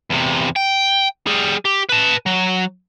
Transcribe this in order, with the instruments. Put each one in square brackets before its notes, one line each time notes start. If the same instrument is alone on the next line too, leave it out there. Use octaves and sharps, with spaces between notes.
[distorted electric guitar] E2 C3
G5
G3 G#4
G4
B4 A5
F#3